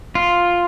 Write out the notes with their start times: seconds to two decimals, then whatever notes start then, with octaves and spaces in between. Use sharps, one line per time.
0.15 F4